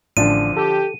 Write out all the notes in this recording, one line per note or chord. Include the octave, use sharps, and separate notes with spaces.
A1 D3 F3 D4 D5 D#7
G4 A4